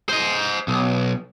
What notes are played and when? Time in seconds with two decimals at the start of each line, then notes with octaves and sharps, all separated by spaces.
0.09 C5 D#5
0.68 B1